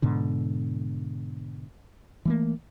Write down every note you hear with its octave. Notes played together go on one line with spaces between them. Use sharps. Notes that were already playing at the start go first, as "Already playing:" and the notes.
G#2 B2 D3
E3 A3 A#3